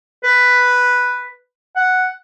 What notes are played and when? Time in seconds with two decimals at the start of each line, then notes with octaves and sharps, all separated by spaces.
0.24 B4
1.77 F#5